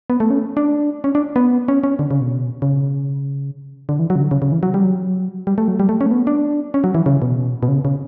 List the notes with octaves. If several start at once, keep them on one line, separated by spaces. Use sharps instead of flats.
B3
A3
C#4
D4
C#4
D4
B3
C#4
C#4
D3
C#3
B2
C#3
D3
E3
F#3
C#3
D3
C#3
C#3
E3
F#3
G3
F#3
G3
A3
F#3
G3
A3
C#4
A3
B3
D4
C#4
F#3
E3
C#3
B2
B2
C#3
C#3